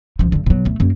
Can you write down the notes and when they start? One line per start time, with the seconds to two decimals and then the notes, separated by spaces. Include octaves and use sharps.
0.19 C#2 F3
0.32 G2 D3
0.46 B2 F#3
0.65 C2 A3
0.80 F#2 A#3